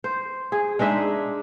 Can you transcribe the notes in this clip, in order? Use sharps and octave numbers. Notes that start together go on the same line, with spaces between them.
C5
G#4
G#3 D4 D#4 E5